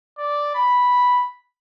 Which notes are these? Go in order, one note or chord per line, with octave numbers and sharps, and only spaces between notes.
D5
B5